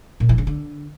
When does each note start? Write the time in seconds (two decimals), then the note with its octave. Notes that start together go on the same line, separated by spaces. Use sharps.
0.20 A#2
0.29 E3
0.38 C#3
0.47 D3